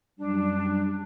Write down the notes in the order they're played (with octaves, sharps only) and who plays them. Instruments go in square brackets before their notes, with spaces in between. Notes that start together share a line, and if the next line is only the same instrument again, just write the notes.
[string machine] F#2 G3 [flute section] D4